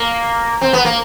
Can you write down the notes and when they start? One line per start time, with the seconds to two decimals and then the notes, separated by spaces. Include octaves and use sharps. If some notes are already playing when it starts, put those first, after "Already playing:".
Already playing: A#3
0.61 C4
0.73 B3
0.85 A#3